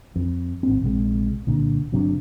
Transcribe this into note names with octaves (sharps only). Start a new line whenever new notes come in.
F2
G#1 C4
A#1 C3 G#3
C2 A#2 D3
G1 C3 F#3 D4